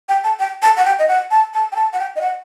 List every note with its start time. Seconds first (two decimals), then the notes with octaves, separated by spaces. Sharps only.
0.09 G5
0.24 A5
0.40 G5
0.62 A5
0.77 F#5
0.85 G5
0.99 D#5
1.08 F#5
1.31 A5
1.54 A5
1.72 G5
1.76 A5
1.93 F#5
1.99 G5
2.16 D#5
2.21 F#5